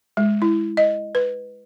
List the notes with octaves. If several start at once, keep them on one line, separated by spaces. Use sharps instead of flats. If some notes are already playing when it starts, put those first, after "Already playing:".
G#3
E4
D#5
B4